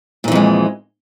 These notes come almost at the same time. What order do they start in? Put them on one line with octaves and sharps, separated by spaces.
A#2 E3 F2 G#3